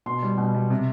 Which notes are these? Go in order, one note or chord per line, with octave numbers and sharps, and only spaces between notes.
B2 C6
G3
B2
G3
C3